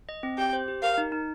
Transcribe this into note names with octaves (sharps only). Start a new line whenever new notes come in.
D#5
C4
G4 G5
C5
G4
A#4 F5
D#4
D#4